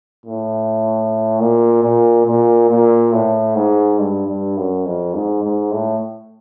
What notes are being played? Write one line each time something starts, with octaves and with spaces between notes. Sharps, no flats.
A2
A#2
A#2
A#2
A#2
A2
G#2
G2
G2
F#2
F2
G#2
G#2
A2